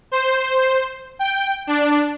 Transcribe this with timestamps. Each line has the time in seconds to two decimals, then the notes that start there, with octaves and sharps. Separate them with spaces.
0.12 C5
1.19 G5
1.67 D4